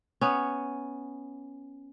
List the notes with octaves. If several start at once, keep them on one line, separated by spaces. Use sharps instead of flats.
B3 C#4